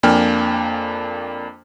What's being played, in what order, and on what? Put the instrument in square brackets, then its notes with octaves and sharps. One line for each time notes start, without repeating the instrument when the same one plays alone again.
[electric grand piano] F2 A#3 D4 G5 G#5 F6